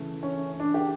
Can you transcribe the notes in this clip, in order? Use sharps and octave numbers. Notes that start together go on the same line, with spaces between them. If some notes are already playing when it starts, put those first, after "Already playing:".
Already playing: C#3 E3 A3
C#4
D4
G4